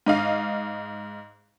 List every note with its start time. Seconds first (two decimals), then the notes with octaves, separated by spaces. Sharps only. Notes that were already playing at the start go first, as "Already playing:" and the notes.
0.06 G#2 D#5 F5